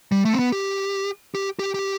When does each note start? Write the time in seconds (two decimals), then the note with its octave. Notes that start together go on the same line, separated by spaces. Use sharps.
0.12 G3
0.25 A3
0.33 C4
0.39 B3
0.52 G4
1.35 G4
1.59 G4
1.74 G4